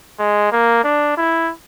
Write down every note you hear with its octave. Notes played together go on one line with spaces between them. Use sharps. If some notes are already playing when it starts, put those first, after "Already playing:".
G#3
A#3
D4
E4